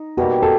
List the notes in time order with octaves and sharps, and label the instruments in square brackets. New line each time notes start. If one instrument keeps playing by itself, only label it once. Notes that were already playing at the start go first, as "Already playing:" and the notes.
Already playing: [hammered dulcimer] D#4
[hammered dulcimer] B2 G3 A#3 [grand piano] F#4
[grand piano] A4